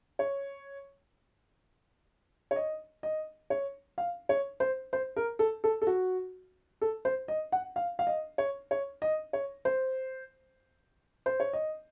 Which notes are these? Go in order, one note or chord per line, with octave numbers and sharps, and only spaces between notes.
C#5
C#5
D#5
D#5
C#5
F5
C#5
C5
C5
A#4
A4
A4
A4
F#4
A4
C5
D#5
F#5
F5
F5
D#5
C#5
C#5
D#5
C#5
C5
C5
C#5
D#5